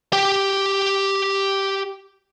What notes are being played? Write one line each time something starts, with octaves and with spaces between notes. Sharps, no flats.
G4 G5